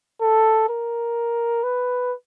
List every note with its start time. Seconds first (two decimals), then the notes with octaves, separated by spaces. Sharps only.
0.21 A4
0.69 A#4
1.63 B4